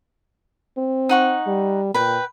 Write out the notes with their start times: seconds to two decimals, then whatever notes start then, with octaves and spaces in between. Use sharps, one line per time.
0.78 C4
1.09 D#4 F#5 C#6
1.47 G3
1.94 A#2 B4 G5